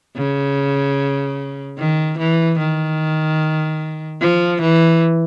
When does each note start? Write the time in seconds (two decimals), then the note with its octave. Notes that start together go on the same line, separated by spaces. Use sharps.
0.17 C#3
1.78 D#3
2.18 E3
2.59 D#3
4.21 F3
4.61 E3